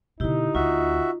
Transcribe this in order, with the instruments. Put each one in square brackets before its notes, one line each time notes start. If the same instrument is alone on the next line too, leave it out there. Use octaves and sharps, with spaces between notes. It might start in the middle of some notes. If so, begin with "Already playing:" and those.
[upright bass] B2 D3 [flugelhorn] D#4 [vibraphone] E4 G4
[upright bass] D2 [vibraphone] F4 [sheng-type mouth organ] F#4 E5